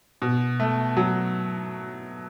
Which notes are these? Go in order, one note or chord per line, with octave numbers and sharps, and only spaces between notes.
B2
A3
F#3